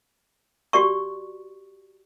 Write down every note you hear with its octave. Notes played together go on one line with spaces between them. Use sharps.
F#4 G4 D5 C#6